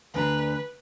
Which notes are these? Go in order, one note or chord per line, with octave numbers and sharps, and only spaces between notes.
D2 D4 B4 A#5